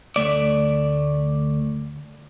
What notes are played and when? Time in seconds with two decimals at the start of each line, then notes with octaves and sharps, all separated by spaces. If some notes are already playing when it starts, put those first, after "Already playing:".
0.16 D2 A3 D5